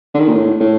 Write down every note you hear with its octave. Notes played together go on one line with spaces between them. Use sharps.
D3
D#3
A#2
A2
A2